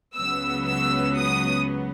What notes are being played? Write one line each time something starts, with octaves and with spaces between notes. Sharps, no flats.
C#2 C#3 F#3 B3 E6
E6
D#6